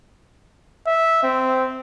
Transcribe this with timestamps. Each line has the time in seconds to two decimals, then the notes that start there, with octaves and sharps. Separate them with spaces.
0.87 E5
1.23 C4